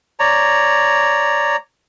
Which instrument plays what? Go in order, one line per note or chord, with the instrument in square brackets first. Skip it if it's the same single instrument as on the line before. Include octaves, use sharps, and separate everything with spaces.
[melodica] C#5 D5 A#5